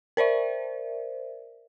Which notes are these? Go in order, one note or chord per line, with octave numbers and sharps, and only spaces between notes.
A#4 C5 D5 E5